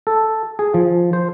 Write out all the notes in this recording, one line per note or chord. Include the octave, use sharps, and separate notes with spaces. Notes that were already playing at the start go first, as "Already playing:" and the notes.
A4
G#4
F3
C5